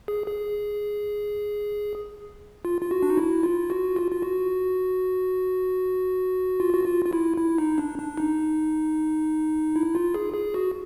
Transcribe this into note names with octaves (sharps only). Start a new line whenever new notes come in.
G#4
G#4
F4
F4
F#4
D4
D#4
E4
F4
F#4
F4
F4
F#4
F4
F#4
F4
F4
E4
E4
D#4
D4
D4
D#4
E4
F4
G#4
G#4
F#4